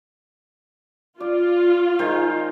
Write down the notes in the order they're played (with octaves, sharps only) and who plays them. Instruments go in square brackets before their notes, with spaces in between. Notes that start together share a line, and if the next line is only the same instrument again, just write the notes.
[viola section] F4 [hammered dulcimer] D5
[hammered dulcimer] D#3 G#3 C5